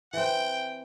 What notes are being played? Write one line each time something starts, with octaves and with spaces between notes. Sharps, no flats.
E3 C4 G5